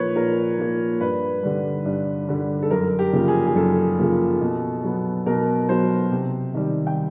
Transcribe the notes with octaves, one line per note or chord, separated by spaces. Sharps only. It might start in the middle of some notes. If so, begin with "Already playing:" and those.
Already playing: A#2 F3 A#3 B4 C#5
A#2 A#4
F3 A#3
G2 B4
D3 G3
G2
D3 G3
A4
F#2 A#4
G4
C#3 F3 A#3
G#4
G#4
F#2 A4
C#3 F3 A#3
B2
F#3 B3
B2 A#4
F#3 B3 C5
C3
D#3 G3
G5